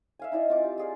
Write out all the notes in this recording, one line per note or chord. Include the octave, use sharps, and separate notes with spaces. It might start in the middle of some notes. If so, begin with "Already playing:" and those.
E5 F5 G#5
D#4 E4 D5 D#5
C4 F4 D6
G4
F4 G#4 D5